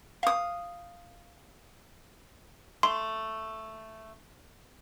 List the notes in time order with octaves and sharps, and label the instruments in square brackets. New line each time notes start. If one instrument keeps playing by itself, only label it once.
[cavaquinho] F5 D#6
[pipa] A3 [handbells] C6